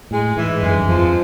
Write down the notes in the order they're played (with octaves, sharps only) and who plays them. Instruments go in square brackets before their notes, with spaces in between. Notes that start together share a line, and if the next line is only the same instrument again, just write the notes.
[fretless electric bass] A2 [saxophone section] G#3
[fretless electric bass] G#2 [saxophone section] E3
[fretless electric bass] F#2 [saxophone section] G#3
[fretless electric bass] G2
F#2
[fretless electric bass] F2 [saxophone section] F3